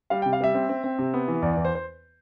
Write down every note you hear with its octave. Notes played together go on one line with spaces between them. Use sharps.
G3 F5
G5
C3
F5
G3 E5
C4
C4
C4
C3
B3
E3
E2 D5
D5
E2
C5
C5